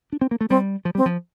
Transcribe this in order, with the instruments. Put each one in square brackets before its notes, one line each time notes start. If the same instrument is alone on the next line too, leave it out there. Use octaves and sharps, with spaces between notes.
[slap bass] D4
C4
A#3
A3
[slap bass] G3 [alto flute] C4
[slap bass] F3
[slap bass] G3 [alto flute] C4
[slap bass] F3